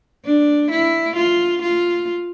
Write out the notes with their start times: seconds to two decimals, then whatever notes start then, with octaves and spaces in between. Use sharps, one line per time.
0.25 D4
0.71 E4
1.16 F4
1.62 F4